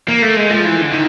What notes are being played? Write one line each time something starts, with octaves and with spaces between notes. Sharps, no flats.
A#3
A3
G#3
F3
E3
D3
D#3